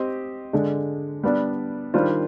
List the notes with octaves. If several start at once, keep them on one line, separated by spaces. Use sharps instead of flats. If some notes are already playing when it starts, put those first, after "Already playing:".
Already playing: C4 G4 C5 D#5
D3 G#3 D4
G3 B3 D4
D#3 G3 D4 F4 C5